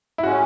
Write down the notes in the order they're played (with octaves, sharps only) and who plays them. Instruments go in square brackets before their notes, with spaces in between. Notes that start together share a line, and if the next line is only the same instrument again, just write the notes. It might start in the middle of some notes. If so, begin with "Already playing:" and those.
[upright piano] E4
[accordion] A2 G#3 C#4 [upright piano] F#4